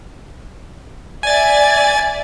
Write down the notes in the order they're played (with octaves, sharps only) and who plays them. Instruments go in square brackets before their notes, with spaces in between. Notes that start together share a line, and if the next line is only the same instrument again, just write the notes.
[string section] D5 E5 [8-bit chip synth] G#5 A6